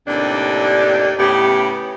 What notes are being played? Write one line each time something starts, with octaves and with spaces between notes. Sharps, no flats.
D#2 A2 C3 D4
A2 C#3 B3 G4